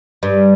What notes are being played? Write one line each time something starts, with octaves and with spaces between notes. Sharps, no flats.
G2